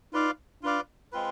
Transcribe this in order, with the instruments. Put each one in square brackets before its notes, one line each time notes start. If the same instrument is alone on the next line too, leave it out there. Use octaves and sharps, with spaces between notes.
[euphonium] D#4 [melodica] F4 B4 D5 F5
[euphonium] D4 [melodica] F4 B4 D5 F5
[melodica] G#3 C4 F4 B4